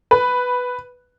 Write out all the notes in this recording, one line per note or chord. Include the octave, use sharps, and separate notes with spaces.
B4